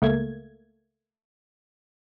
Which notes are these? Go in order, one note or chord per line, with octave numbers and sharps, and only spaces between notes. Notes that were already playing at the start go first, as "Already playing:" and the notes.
C#2 A3 A#3 G#6